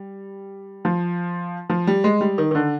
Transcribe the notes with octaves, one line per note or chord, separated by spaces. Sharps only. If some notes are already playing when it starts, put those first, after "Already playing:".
Already playing: G3
F3
F3
G3
G#3
G3
D#3
D#3
D3